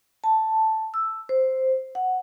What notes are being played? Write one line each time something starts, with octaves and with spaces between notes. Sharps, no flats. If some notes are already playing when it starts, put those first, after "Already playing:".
A5
E6
C5
F#5